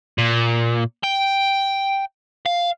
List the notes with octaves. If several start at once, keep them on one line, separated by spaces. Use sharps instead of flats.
A#2
G5
F5